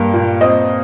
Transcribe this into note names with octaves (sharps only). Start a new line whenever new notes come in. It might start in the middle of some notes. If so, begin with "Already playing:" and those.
Already playing: G2 A#3
A#2
C4 D#5